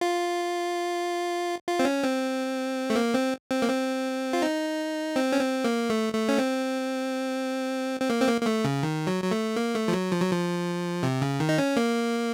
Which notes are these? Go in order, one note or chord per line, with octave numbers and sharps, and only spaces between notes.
F4
F4
C4
C#4
C4
A3
A#3
C4
C4
A#3
C4
F4
D#4
C4
C#4
C4
A#3
A3
A3
C#4
C4
C4
A#3
C4
A#3
A#3
A3
C#3
D#3
F#3
F#3
A3
A#3
A3
F3
F#3
F3
F#3
F3
C3
C#3
D#3
D#4
C#4
A#3